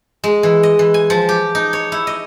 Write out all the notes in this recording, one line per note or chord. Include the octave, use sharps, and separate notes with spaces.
G#3
E3
D#5
E3
G#5
F3
G4
D#4
C#5
E4
D#5